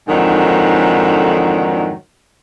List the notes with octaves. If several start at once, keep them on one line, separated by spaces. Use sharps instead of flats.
F2 G#2 D3 D#3 F#3